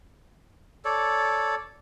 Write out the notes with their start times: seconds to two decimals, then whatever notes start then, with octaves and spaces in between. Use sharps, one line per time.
0.85 A4 C#5 D5